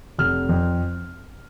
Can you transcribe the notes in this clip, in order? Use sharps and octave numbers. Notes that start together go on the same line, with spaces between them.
F1 F6
F2